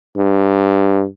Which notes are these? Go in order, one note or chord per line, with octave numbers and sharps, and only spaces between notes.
G2